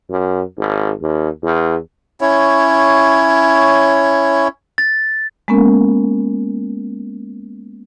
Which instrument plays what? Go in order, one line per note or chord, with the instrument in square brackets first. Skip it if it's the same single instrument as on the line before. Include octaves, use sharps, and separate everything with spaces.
[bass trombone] F#2
G#1
D#2
E2
[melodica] C#4 E4 C#5
[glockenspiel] A6
[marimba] G#3 A#3 B3 C#4 A#4